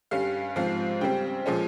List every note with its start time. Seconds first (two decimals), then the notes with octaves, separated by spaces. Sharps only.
0.11 G2 G3 C#4 F5
0.56 G#2 F3 C4 F5
1.01 C#3 G3 C4 G5
1.46 A#2 F3 G#3 C#4